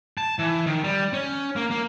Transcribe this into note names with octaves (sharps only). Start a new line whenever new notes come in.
A5
E3
D#3
G3
C#4
A#3
A#3